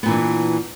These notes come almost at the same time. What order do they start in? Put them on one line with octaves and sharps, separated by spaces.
B3 A#2 E3 D4